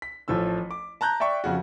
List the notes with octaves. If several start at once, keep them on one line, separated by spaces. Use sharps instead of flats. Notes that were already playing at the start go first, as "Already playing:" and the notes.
B6
A1 F3 A3 E6
D6
A5 A#5 F#6 G6
D5 E5 G5 C#6
F2 C#3 F#4